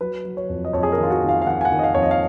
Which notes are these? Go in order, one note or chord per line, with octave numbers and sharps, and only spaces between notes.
F#3 B4
F#3
C#5
F2
D#5
F2 C#5
G#4
A#4
D#3
F4
F#4
D#3
F5
F5
D#3 F#5
G#5
F#5
D#3
D#5
F5
F2 C#5
D#5
F5